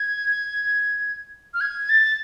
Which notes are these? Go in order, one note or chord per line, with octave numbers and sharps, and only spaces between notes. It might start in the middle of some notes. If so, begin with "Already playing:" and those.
Already playing: G#6
F6
G#6
A6